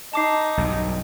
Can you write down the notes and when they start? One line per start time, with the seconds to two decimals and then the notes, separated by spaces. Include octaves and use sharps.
0.13 D#4 A5 D6 C7
0.57 B1 G2 B2